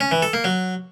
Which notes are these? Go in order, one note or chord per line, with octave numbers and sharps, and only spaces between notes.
C#4
E3
A4
A#3
F#3